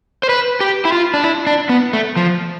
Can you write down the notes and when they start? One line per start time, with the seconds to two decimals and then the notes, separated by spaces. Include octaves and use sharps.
0.23 C5
0.29 B4
0.60 G4
0.85 E4
0.92 F4
1.14 D4
1.24 E4
1.47 D4
1.69 B3
1.93 A3
2.17 F3